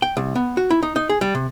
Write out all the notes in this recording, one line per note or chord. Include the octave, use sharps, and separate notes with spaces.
G5
C2
B3
F#4
E4
D#4
D#4
G#4
G3
C3